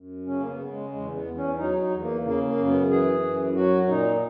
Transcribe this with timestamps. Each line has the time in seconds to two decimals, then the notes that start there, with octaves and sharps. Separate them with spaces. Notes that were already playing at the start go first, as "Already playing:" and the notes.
Already playing: F#2
0.26 C#3 C#4
0.40 A#3
0.48 B3
0.59 C#3
0.70 G#3
0.92 E2 G#3
1.14 B3
1.25 E2
1.36 C#4
1.58 F#3 D#4
1.80 D#4
1.91 E2
2.02 A#3
2.23 C#3 A#3
2.46 A#3
2.56 F#2
2.68 B3
2.90 E3 G#4
3.22 F#2
3.55 F#3 F#4
3.88 A#2 D#4